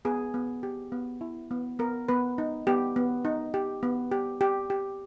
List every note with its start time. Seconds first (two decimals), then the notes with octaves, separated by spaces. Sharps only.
0.05 B3 G#4
0.34 B3
0.63 G4
0.92 B3
1.21 E4
1.51 B3
1.79 B3 A#4
2.09 B3 B4
2.38 D#4
2.67 B3 G4
2.96 B3
3.25 D#4
3.54 G4
3.83 B3
4.12 G4
4.41 G4
4.70 G4